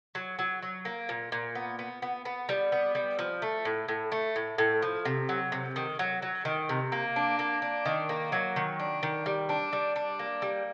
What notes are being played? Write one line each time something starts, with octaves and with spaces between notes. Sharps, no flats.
F#3
F#3
F#3
A#3
A#2
A#2
B3
B3
B3
B3
G3
B3
G3
F3
A3
A2
A2
A3
A2
A2
F3
C3
F#3
C3
D#3
F#3
F#3
D#3
C3
A#3
D4
A#3
D4
D#3
A#3
F#3
D#3
D4
D#3
G3
D4
G3
D4
A#3
G3